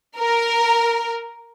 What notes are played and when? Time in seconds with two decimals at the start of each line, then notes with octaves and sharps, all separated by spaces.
0.18 A#4